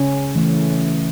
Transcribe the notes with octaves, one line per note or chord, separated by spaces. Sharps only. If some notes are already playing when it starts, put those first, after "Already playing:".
Already playing: C#3 C#4
E3 A3